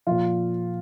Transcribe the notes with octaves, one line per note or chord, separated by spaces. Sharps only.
A#2 F3 F4